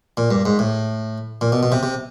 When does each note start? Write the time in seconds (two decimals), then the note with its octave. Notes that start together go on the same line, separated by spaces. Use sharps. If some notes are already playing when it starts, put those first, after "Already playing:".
0.17 A#2
0.31 G2
0.45 G#2
0.59 A2
1.41 A#2
1.52 B2
1.63 B2
1.72 C3
1.83 C3